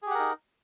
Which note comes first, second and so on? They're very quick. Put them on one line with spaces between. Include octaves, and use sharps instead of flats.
G#4 G4 F#5 A#4 D#4